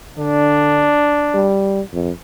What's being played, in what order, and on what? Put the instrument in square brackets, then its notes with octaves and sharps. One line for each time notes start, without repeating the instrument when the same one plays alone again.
[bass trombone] D3 [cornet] D4
[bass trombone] G3
F2